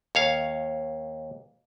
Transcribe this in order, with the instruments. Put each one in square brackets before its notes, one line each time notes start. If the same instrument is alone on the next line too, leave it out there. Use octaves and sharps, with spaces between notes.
[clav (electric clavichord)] D#2 C#5 F5